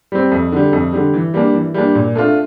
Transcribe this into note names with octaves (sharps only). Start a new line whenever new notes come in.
G3 C4
F2
D3 G3
F2
D3 G3
E3
G3 A#3 D4
E3
G3 A#3 D4
A#2
A3 D4 F4